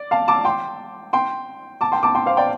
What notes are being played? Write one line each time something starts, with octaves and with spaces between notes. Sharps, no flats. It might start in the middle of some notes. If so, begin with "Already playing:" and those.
Already playing: D5
F5 A5
A5 D6
G5 C6
G5 C6
A5 D6
G5 C6
A5 D6
G5 C6
C5 F5
D5 G5